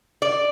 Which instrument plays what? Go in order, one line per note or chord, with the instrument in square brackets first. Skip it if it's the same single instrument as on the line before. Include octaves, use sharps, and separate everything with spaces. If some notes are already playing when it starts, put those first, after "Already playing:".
[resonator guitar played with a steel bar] D5